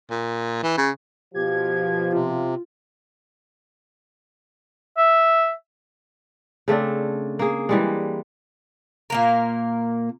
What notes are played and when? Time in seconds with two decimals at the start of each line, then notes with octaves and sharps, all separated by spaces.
0.11 A#2
0.63 E3
0.78 C#3
1.35 B2 F3 G4 G#6
2.13 C3 F4
4.97 E5
6.68 C#3 A3 C4 D4
7.39 A#3 G#4
7.69 E3 G3 G#3
9.10 A#2 A#3 A#4